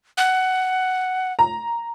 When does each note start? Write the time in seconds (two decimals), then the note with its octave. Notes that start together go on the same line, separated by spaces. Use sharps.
0.17 F#5
1.39 A#5